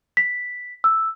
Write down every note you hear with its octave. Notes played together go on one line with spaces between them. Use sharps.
B6
E6